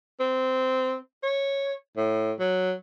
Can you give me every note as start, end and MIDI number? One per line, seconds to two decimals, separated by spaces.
0.20 0.96 60
1.23 1.73 73
1.97 2.32 45
2.40 2.73 54